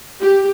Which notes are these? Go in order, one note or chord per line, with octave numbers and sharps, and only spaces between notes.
G4